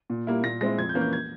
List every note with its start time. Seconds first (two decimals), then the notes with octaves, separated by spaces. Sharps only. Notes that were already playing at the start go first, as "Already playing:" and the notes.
0.10 A#2
0.27 G3 A#3 E4
0.44 A#2 A#6
0.61 G#3 C4 E4 A#6
0.78 F2 G#6
0.89 G6
0.95 E3 A#3 C#4
1.01 G6
1.13 G#6